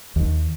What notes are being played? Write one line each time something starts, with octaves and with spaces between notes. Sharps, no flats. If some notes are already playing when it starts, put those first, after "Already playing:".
D#2